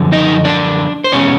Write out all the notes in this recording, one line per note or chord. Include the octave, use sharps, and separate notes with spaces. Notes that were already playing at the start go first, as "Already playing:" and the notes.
Already playing: F#2 D3 F3
D#4 D#5
D4 D5
C5
E2 B2 G#3 C#4 C#5